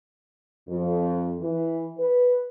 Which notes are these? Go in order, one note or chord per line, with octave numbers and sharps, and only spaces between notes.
F2
E3
B4